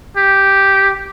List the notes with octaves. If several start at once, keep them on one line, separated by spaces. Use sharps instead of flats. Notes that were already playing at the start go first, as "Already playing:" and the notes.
G4